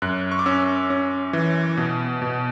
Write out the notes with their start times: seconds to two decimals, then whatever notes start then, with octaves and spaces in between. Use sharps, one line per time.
0.02 F#2 F#6
0.32 C#6
0.39 D6
0.46 C#4 E6
0.90 C#4
1.33 E3
1.77 B2
2.22 B2